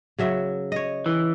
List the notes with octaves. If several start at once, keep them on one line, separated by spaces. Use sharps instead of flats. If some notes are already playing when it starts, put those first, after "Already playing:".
C#3 F#3 E5
C#5 D#5
E3